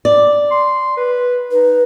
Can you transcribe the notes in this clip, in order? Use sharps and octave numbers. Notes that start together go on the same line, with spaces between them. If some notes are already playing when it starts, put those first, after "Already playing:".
D5
C6
B4
D#4 B4